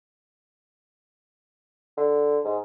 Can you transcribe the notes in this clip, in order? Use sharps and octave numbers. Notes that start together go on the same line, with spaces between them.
D3
G#2